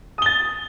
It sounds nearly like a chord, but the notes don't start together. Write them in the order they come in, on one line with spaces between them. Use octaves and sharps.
D#6 G7 A6